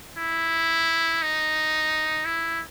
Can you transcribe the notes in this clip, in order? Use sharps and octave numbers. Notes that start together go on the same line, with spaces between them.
E4
D#4
E4